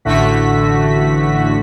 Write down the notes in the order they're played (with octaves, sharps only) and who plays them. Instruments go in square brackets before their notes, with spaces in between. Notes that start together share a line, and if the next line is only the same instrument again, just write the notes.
[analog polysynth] A1 A2 D3 A3 F#4 B6